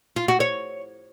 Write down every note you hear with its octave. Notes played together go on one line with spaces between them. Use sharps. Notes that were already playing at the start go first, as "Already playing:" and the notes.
F4
F#4
C#5